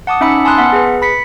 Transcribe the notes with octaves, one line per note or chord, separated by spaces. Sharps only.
F#5 A5 D6 D#6
C#4 D#4 E5 B5 E6 C#7
G#5 A5 B5 C6 D#6 F#6
B3 E5 F#5
G#4 B4
B5 B6 C#7